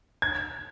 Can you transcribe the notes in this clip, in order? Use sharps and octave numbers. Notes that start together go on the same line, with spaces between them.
G#6